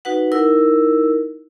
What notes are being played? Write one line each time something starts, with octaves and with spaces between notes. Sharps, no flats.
D#4 F#4 B4 F#5
D#4 E4 A#4 E6